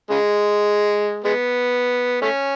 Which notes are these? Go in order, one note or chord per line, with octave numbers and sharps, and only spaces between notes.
C#3 G#3
G#3 B3
A3 C#4